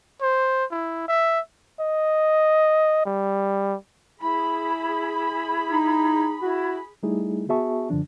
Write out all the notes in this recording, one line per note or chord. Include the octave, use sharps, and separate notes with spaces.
C5
E4
E5
D#5
G3
E4 G#4 B5
D#4
E4 F#4
G3 A3 D#4 E4 G#4
B3 F#4 G#4 E5 A5 C#6
F#2 D3 F3 D4